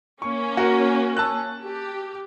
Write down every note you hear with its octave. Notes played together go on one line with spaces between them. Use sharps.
A#3 C#4 C#6
F#4 A#4
A5 E6 F#6
G4